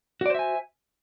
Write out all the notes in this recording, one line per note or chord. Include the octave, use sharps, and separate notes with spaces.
F#4 C5 D5 E5 G#5